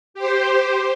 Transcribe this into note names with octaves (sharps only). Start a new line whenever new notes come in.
G4 C5